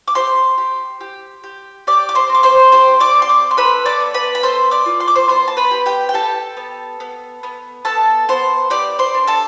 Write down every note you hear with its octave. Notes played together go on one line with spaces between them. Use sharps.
D6
G4 C5 C6
G4
G4
G4
G4 D5 D6
D6
C5 C6
C4
D6
C5 C6
G4 C5 C6
D5 D6
C4
C6
D5 D6
C6
A4 B4 B5
D5 D6
B3
B4 B5
B5
A4 C5 C6
D5 D6
F4
C6
D6
C5 C6
B3 C5 C6
A5
B4 B5
G4
G4 G5
G5
G4 A4 A5
B3
B3
B3
B3 A4 A5
B3 C5 C6
G4 D5 D6
C5 C6
D4
A4 A5